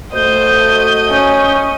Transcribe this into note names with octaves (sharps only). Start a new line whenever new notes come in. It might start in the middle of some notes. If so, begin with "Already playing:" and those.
A3 F#4 C5 D#5 G6
C#4